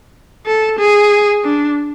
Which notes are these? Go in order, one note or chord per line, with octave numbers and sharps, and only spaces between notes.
A4
G#4
D4